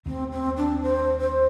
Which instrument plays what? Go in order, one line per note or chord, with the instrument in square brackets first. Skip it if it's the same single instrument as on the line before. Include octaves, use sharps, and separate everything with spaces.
[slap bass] D#2 D#3 A3 [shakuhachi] C4
[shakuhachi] C4
D4
C5
C5